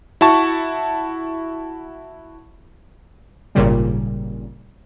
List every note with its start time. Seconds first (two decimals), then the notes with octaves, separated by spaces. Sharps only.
0.21 E4 F#4 A5 C#6
3.55 G#1 A#2 C#3 G3